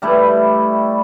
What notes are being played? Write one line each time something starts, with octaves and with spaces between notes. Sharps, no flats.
G3 A3 E4 B4